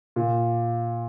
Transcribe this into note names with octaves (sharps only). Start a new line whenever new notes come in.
A#2